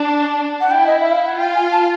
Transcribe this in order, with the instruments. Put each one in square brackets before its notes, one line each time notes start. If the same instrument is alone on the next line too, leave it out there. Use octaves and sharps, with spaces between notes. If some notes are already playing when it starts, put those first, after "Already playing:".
Already playing: [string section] D4
[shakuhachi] F#5
[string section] E4 [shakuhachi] G5
[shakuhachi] D#5
E5
F5
F#5
[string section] F4 [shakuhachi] G5
[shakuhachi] G#5
A5